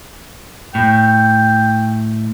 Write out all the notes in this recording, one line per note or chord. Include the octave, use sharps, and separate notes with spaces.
A2 G5